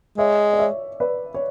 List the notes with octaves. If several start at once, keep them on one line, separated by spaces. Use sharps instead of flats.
G#3 C#5 E5
D5
C#5 E5
B4 D5
C#5